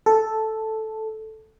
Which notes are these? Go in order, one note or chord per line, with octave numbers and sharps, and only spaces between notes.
A4